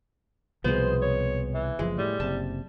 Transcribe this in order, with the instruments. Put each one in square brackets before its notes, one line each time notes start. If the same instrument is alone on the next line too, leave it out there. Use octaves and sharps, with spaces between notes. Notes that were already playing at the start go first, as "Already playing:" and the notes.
[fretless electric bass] C2 B2 F3 [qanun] G#3 B3 [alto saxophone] C5
[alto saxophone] C#5
E3
[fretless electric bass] F#1 F3 [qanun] G#3
[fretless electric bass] A2 [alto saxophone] G3
[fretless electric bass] F#1 C3 [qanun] A5